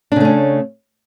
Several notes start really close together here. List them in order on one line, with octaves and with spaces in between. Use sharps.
D4 C#3 A3 C#4